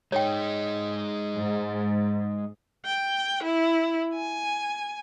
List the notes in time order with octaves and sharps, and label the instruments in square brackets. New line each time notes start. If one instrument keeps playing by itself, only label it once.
[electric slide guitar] G#3 D#4 [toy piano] C#5 G5
[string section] G#2
[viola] G5
E4
G#5